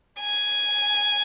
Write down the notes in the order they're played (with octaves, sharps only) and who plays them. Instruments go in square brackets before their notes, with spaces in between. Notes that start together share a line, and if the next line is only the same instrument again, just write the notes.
[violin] G#5